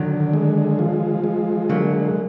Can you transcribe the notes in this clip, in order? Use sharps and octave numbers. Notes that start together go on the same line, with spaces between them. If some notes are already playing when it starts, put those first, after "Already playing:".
Already playing: D3 D#3 F#3
G#3
F3
G#3
D3 F#3 A#3